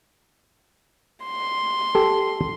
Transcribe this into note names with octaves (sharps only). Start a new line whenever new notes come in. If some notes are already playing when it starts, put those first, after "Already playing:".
C6
G4 A4